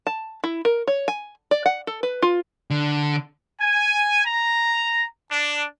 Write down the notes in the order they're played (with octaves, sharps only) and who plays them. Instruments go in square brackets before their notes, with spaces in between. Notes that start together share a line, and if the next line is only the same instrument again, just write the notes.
[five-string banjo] A5
E4
A#4
C#5
G#5
D5
F#5
A4
B4
F4
[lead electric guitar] D3
[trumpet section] G#5
A#5
D4